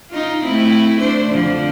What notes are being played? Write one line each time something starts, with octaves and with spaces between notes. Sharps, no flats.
D#4 F4
A3 C4 E4
D4 C5
F2 D3 F3